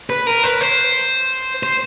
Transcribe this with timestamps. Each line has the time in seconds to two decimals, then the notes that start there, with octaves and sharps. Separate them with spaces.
0.10 B4
0.27 A#4
0.44 B4
0.61 C5
1.63 C5